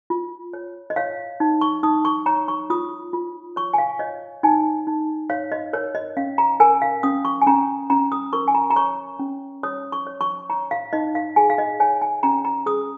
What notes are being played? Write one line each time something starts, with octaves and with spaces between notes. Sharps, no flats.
F4
C#5
D#5
C#5 F5
D#4
C#6
D#4 D#6
C#6
C#5 A#5
C#6
F4 D#6
F4
C#5 C#6
G#5
F5
C#5 D#5
D#4 G#5
D#4
C#5 F5
D#5
A#4 C#5
D#5
C#4 F5
A#5
A#4 G#5
F5
C#4 D#6
C#6
G#5
C#4 A#5
C#4 A#5
D#6
A#4 C#6
G#5
A#5
A#5
C#5 C#6
C#4
C#5 D#6
C#6
C#5
C#6
C#5 A#5
F5
D#4 D#5
F5
G#4 G#5
F5
D#5
C#5 G#5
G#5
C#4 A#5
A#5
G#4 D#6